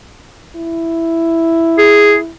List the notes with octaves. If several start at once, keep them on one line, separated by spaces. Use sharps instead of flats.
E4
G#4